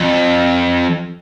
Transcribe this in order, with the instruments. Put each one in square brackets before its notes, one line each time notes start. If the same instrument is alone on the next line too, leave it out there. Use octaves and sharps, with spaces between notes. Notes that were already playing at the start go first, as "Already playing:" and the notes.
Already playing: [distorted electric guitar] F2